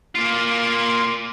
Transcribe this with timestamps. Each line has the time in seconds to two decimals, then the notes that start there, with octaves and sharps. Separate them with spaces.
0.15 A#3 F4